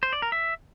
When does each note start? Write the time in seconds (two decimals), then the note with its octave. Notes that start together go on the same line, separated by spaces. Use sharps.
0.03 C5
0.13 D5
0.22 A#4
0.32 E5